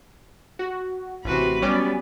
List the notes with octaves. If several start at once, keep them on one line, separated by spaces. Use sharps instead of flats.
F#4
A1 C3 F#4 B4
F#3 G3 B3 C#4 D5